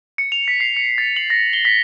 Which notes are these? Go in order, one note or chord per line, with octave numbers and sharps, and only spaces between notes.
C#7
F7
B6
C7
C#7
A6
F#7
A#6
G7
B6